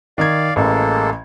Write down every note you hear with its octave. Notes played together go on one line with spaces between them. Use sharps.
D#3 D5 F5 G#6
A1 G#3 A#3 A4